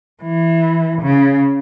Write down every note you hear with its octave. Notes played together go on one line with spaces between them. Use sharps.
E3
C#3